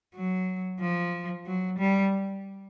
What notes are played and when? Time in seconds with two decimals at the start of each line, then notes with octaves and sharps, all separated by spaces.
0.15 F#3
0.81 F3
1.46 F#3
1.79 G3